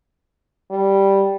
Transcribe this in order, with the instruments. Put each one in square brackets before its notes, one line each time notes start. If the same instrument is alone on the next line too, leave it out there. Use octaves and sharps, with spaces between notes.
[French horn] G3